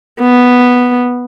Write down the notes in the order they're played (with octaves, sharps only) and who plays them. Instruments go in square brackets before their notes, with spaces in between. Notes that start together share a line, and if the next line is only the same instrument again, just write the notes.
[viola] B3